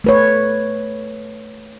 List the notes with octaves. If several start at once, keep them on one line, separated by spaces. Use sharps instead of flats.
A3 B4 C#5